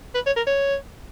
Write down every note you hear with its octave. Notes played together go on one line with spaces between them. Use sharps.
B4
C#5
A#4
C#5